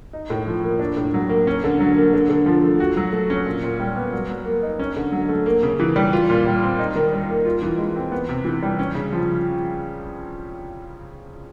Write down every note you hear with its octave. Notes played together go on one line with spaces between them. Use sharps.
D#4
A2
F3
A#3
D4
A2
F#3
A#3
C#4
D3
F#3
A#3
D3
D3
F3
A3
F#4
F#3
A3
C#4
A#2
A#2
G3
B3
F#3
F#3
A#3
D#4
C#4
D3
F#3
A3
A#3
C#3
E3
G3
F4
A#2
G3
C4
D#4
D#3
G3
A#3
F4
E3
G#3
C4
B3
C3
E3
G3
C#4
C#3
F3